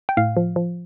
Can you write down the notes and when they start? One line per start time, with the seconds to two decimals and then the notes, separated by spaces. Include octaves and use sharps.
0.09 G5
0.17 A2 F5
0.37 F3
0.56 F3